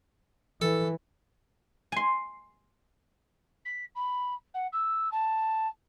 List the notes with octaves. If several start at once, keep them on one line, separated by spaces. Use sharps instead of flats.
E3 A4
G#5 C6
B6
B5
F#5
E6
A5